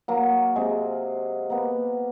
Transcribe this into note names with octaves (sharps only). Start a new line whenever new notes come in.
F#3 A#3
C3 G#3
A#3 B3